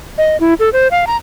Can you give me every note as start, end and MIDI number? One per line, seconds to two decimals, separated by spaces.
0.18 0.37 75
0.40 0.54 64
0.60 0.70 69
0.73 0.88 72
0.91 1.05 77
1.07 1.16 82